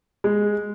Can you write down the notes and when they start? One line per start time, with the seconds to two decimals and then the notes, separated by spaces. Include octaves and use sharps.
0.24 G#3